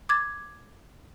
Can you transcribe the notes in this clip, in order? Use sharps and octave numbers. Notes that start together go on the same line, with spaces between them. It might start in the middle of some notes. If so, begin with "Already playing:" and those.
D6 G#6 A6